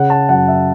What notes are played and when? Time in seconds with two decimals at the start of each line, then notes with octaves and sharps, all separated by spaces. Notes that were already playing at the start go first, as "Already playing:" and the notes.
Already playing: C#3 F#5
0.10 A5
0.29 F#2 F#5
0.48 E5